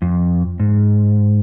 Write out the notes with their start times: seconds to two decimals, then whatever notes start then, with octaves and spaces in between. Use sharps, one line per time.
0.02 F2
0.60 G#2